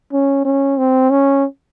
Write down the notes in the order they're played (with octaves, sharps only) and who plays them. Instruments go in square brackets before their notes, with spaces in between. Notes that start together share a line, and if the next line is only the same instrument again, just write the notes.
[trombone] C#4
C#4
C4
C#4